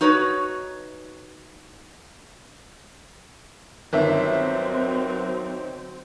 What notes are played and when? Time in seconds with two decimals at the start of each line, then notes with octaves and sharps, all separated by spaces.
0.01 D#4 F#4 B4 C#5
3.93 G1 D#3 F#3 C4 B4 E5